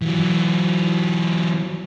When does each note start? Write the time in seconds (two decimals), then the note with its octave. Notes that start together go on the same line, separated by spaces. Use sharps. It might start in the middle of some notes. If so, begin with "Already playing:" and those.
0.02 E3 F#3